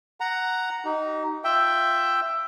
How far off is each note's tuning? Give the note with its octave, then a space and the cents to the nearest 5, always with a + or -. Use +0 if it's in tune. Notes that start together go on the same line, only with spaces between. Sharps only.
F#5 +5 A#5 +0
D#4 +0 G4 -40
F4 +0 E5 +10 G5 +0